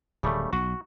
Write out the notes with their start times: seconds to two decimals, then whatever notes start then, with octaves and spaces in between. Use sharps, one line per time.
0.23 D1 C#3 G3 A3
0.53 B1 F#4